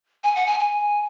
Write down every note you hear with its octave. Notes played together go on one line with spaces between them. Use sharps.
G#5
F#5
G#5
G#5